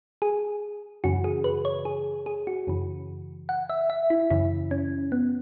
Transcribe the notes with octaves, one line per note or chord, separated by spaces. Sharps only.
G#4
F#2 C#3 E3 F#4
G#4
B4
C#5
G#4
G#4
F#4
F#2 C#3 E3
F#5
E5
E5
E4
F#2 C#3 E3 E4
C#4
B3